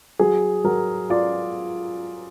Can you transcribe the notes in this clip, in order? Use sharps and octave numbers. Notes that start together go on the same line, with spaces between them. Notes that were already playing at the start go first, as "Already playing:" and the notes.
F#3 G#4
F#3 A#4
F4 D5